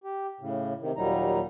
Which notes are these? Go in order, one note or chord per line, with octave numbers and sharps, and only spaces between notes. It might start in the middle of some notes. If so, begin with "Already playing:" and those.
G4
A2 C#3
C3 D#3
D#2 A#2 F#3 G3 D#4 A#5